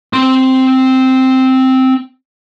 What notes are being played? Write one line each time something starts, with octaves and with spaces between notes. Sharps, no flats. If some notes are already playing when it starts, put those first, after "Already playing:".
C4 C6